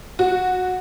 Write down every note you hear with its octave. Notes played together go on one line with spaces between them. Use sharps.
F#4